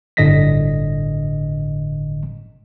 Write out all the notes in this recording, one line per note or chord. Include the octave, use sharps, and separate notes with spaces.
G1 A2 D3 D#5 A#6 B6